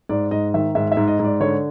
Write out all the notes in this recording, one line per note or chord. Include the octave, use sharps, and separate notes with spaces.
G#2 D5
G#2 D#5
D#3 E5
G#2 E5
E5
G#2
D#5
G#2 D5
D3 C#5